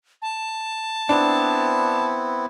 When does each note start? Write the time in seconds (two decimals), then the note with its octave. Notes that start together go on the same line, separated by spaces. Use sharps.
0.22 A5
1.09 B3 C4 D4 E4